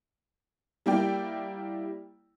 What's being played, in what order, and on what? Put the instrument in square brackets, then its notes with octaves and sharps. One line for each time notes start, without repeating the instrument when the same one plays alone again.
[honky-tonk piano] G3 A#3 E4 D5 G5